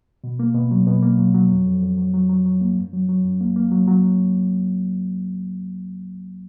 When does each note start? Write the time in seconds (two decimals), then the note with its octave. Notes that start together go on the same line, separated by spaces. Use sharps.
0.24 B2
0.39 A#3
0.55 B2
0.71 F#3
0.87 B2
1.02 A#3
1.19 F#3
1.34 F#3
1.50 F2
1.66 F2
1.82 F2
1.97 F#3
2.14 F#3
2.29 F#3
2.46 F#3
2.61 A#3
2.77 F#2
2.93 F#3
3.09 F#3
3.24 F#2
3.41 A#3
3.56 A#3
3.71 F#3
3.88 F#3